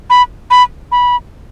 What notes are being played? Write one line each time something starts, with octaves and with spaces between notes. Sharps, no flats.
B5
B5
B5